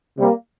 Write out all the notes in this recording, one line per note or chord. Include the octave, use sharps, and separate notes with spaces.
C3 G3 A#3